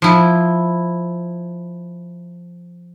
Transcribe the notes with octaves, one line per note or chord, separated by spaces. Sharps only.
F3 E4